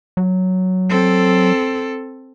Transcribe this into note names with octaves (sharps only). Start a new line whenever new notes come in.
F#3
C4 A4